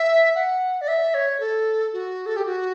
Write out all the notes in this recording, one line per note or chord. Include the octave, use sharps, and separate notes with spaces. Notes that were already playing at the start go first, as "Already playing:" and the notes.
Already playing: E5
F#5
D5
E5
C#5
A4
F#4
A4
G4
F#4